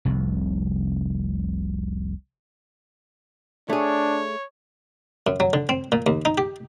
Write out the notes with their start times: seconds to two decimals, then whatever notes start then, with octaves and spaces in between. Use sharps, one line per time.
0.05 F1 C2
3.70 A3 D4 G#4 C#5
5.27 F#2
5.40 F#3
5.53 D3
5.69 C4
5.92 A#2
6.06 D#2
6.25 D#4
6.38 G4